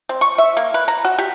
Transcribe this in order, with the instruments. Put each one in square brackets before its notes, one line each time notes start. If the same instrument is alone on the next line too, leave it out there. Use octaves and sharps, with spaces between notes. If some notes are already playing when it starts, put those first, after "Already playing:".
[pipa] C4
C#6
E5
A#3
B4
A#5
F#4
G4